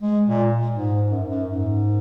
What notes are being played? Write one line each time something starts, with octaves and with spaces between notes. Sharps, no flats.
G#3
A#2
G#2
F#2
F#2
G#2